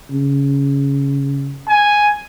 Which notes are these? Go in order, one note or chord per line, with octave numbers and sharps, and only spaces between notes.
C#3
G#5